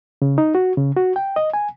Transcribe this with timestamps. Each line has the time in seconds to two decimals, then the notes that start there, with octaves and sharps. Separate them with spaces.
0.22 C#3
0.38 D#4
0.55 F#4
0.77 C#3
0.97 F#4
1.16 G5
1.36 D#5
1.54 G#5